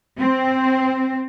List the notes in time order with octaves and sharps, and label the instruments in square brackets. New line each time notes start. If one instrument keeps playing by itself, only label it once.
[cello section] C4